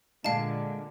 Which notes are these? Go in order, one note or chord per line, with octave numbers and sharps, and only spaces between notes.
A#2 D3 G#3 D4 F5 A5